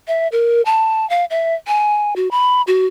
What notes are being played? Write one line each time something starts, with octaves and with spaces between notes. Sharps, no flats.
E5
A#4
A5
F5
E5
G#5
F#4
B5
F#4